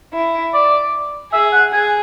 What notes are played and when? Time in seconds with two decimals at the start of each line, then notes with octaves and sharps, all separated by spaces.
0.13 E4
0.54 D5
1.32 G#4 E5
1.52 F#5
1.72 G#4 G#5